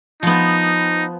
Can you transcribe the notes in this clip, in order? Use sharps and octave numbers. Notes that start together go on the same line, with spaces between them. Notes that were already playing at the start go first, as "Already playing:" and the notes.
F3 B3 D#4